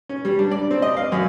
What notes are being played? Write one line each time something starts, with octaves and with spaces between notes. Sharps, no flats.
C#4
G3
D4
D5
C4
D#5
F5
F#2